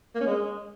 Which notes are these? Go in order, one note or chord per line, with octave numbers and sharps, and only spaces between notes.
A#3
C#4
G#3